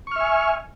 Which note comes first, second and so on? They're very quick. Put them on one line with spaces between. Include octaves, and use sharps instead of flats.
C#6 F6 E5 G#5